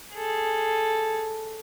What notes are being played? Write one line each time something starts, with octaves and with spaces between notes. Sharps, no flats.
G#4 A4